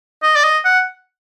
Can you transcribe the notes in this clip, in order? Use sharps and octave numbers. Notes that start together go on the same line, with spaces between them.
D#5
D5
D#5
F#5